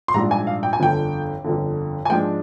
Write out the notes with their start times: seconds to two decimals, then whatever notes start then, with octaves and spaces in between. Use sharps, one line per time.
0.08 C6
0.14 A#1 G#2 G3 D4 A#5
0.31 G#5
0.47 F5
0.63 G5
0.73 G#5
0.80 G1 F2 D3 G5
1.44 G1 F2 D3
2.05 G#5
2.10 G#2 F3 G#3 D4 G5